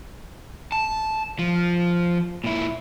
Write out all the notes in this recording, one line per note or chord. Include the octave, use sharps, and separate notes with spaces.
A5
F3
A#2 E4